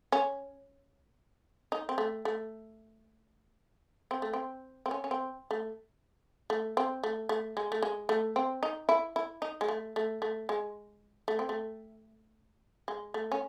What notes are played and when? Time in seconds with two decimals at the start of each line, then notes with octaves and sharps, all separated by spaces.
0.12 C#4
1.72 D#4
1.89 C4
1.98 A3
2.25 A3
4.11 C4
4.22 A3
4.33 C4
4.86 C4
4.91 C#4
5.04 C#4
5.11 C4
5.51 A3
6.50 A3
6.77 C4
7.03 A3
7.29 A3
7.57 G#3
7.72 A3
7.82 G#3
8.09 A3
8.36 C4
8.63 D#4
8.89 E4
9.16 E4
9.42 D#4
9.61 G#3
9.68 A3
9.96 A3
10.22 A3
10.49 G#3
11.28 A3
11.39 C4
11.49 A3
12.88 G#3
13.14 A3
13.32 C#4